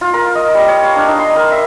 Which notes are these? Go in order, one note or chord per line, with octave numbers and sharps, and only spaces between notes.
F4
A#4
D#5
G3
C#5
F5
D4
D#4
C6
A#4
E5